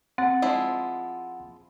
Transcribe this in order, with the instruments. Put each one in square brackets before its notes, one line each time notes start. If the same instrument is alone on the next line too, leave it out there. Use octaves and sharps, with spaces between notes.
[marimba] C4 [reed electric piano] F#5 A6
[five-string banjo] F3 G#3 E4